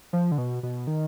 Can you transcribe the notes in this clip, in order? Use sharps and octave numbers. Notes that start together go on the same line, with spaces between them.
F3
D3
B2
B2
D#3